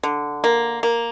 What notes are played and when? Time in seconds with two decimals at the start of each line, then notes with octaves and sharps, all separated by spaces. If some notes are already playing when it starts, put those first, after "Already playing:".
0.03 D3
0.44 A#3
0.83 A#3